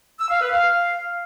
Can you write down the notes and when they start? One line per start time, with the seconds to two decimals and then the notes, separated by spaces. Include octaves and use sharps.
0.18 E6
0.29 F5
0.40 B4
0.52 F5